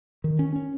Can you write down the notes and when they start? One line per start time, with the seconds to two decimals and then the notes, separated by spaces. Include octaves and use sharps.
0.24 D#3
0.39 C#4
0.56 C#4